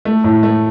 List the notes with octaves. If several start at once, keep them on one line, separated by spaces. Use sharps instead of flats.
A3
A2
A3